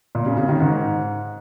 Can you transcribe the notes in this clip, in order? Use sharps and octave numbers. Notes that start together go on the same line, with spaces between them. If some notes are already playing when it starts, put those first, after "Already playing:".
A#2
C#3
C#3
D#3
G#2